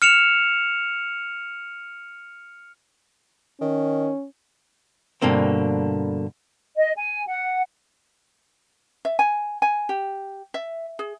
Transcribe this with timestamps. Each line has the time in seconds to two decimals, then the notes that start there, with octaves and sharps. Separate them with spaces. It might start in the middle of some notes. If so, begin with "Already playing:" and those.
0.02 F6 C#7 E7 F7
3.61 D#3 C#4
5.22 G2 B2 D3 A#3 C4
6.77 D#5
6.97 G#5
7.28 F#5
9.05 E5
9.19 G#5
9.62 G#5
9.89 G4
10.54 E5
10.99 G#4